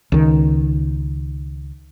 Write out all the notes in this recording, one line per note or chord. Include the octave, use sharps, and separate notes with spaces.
C#2 D#3